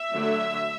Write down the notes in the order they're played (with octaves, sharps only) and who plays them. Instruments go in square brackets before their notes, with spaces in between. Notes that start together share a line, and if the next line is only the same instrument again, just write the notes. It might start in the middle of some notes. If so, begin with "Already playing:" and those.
Already playing: [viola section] E5
D3 F#3 A3